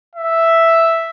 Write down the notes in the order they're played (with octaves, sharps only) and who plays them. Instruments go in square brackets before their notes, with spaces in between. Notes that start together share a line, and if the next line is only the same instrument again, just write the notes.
[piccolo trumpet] E5